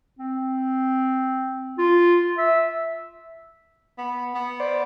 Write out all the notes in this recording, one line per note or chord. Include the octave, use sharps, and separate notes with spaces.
C4
F4
E5
B3
B3
C5 D5